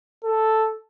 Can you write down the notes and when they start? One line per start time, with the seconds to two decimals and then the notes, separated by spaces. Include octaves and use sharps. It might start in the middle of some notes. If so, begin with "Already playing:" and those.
0.24 A4